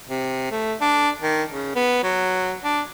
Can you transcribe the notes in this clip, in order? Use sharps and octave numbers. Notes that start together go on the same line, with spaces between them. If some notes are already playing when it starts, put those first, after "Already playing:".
C3
A3
D4
D#3
C#3
B3
F#3
D4